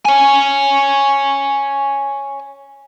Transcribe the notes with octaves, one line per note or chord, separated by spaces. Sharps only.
C#5 G#5